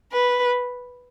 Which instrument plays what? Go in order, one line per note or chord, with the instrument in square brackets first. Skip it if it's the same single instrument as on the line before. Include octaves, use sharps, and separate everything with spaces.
[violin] B4